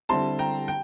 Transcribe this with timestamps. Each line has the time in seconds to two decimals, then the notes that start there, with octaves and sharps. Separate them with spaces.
0.09 D3 G3 C4 E4 A5 C6
0.39 G5 A#5
0.68 G5